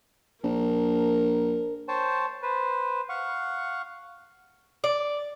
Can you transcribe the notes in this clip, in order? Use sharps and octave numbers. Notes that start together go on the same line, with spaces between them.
A#1 A#4
C5 C#5 G5 A5
B4 C5
F5 F#5 C#6
D5